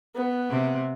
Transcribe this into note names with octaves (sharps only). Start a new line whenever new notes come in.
B3
C3